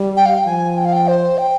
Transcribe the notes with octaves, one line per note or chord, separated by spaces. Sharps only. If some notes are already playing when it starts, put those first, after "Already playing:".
Already playing: G3
G5
F5
G5
F3 G#5
G5
F5
G5
C5
G5